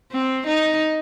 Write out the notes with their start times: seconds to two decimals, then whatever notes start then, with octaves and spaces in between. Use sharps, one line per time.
0.12 C4
0.47 D#4